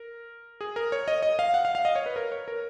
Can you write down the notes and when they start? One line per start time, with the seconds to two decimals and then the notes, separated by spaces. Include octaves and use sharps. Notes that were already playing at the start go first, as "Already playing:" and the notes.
Already playing: A#4
0.61 G#4
0.76 A#4
0.92 C#5
1.08 D#5
1.23 D#5
1.39 F5
1.54 F#5
1.65 F5
1.75 F5
1.85 D#5
1.96 C#5
2.06 B4
2.16 A#4
2.32 C#5
2.48 A#4